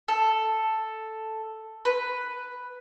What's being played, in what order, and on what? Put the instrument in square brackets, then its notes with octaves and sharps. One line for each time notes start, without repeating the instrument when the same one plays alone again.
[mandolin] A4
B4